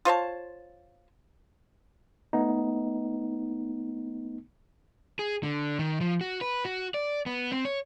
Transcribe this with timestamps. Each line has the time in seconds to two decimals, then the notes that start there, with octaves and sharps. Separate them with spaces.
0.05 F4 C5 C#5 A5
2.33 A3 B3 D#4
5.19 G#4
5.43 D3
5.79 D#3
6.01 F3
6.21 F#4
6.41 B4
6.65 F#4
6.94 D5
7.26 B3
7.52 C4
7.65 C#5